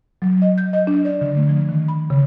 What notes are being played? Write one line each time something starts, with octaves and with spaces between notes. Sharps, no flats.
F#3
D#5
G6
D#5
D4
D5
D3
A3
F3
D#3
B5
C#3